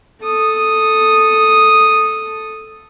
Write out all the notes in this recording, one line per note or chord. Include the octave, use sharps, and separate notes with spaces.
A4 D#6